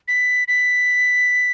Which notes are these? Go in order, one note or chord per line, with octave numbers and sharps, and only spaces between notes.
B6
B6